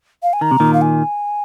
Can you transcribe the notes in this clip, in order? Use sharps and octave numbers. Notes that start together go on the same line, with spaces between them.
F5
G#5
D#3 A#5
C3
A#2 D#3
F5
G#5